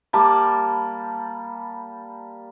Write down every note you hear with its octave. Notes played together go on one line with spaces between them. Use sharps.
G3 A#3 A5 B5